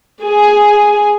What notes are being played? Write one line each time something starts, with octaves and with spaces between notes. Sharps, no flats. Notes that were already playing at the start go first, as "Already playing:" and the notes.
G#4 G#5